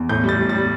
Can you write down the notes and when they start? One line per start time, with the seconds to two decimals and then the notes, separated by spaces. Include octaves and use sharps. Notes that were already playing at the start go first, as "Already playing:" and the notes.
Already playing: E2
0.09 A2 G6
0.23 G3
0.29 A6
0.39 G3
0.49 G3 A6